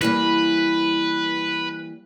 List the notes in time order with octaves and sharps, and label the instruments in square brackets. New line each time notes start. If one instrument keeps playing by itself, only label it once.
[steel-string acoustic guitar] E3 G3 A#3 [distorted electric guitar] B4